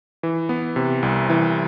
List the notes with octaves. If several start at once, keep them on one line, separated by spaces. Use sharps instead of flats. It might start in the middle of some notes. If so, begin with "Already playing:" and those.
E3
B3
C3
C2
E3